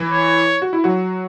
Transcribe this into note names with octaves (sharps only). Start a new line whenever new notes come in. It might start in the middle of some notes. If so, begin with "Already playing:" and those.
Already playing: E3 E4
C#5
F#4
E4
F#3 F#4